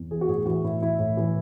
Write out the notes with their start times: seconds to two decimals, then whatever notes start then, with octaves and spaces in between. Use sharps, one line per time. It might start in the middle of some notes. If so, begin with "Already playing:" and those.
Already playing: E2
0.11 E3 G#4
0.21 F#4
0.28 A2 G#4
0.46 E3 F#4
0.64 A2 E4
0.81 E3 E4
0.99 A2
1.17 E3